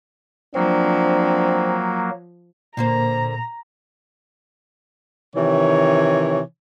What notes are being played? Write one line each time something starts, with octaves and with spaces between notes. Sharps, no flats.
F3 F#3 A#3 C4 D4
A#2 D3 A#3 C5 A#5
C3 D#3 E3 C#5